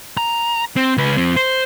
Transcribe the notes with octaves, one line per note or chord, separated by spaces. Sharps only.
A#5
C4
C#2 B4
F2 C4
C5